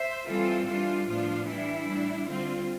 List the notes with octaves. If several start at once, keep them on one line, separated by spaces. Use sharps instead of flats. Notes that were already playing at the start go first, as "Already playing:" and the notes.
Already playing: C5 E5
E3 G3 C4 F4 A4
E3 G3 D4 F4
A2 F3 B3 D4 F4
E3 G3 D4 E4
A2 G3 D4
D3 G3 C4 F4